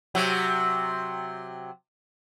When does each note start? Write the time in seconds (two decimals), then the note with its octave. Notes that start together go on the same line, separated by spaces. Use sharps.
0.15 C3 F#3